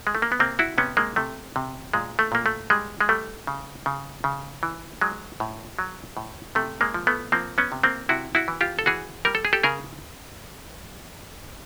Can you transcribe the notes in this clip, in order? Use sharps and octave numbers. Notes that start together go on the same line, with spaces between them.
G#3
A3
A#3
B3
C3 A#3 C4
E4 F#4
C3 B3 C#4
G#3 A#3
C3 A3
C3
A#2 G#3
A3
A#2 A#3
A3
G3 G#3
G#3
G3 A3
C#3
C#3
C#3
E3
F#3 G#3
A2
F#3
A2
C3 A3
G#3 A#3
F3
A3 B3
F3 A#3 C4
B3 C#4
C3
A#3 C4
C3 E4 F#4
E4 F#4
E3
F4 G4
A4
E3 F#4 G#4
G3 A#4
A4
G#4
G4 A4
C#3 G#4 A#4